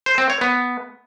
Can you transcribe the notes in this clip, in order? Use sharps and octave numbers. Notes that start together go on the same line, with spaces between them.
C5
C4
C#5
B3